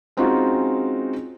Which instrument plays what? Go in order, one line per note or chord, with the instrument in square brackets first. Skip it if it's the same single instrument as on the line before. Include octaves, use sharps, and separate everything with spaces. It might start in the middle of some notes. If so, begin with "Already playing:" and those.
[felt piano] G#3 C4 C#4 D#4 F4 F#4